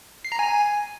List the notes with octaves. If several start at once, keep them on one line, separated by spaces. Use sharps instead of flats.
C7
A#5
G#5